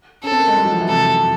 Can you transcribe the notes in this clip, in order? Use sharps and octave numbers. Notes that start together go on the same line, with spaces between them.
C#4 A4
C4
A#3
G#3
G3
F#3
F3
E3
C3 A4